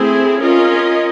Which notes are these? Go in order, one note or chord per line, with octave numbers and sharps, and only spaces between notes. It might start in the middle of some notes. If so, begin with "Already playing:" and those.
Already playing: A3 C4 E4 G#4
C#4 F4 A#4 D#5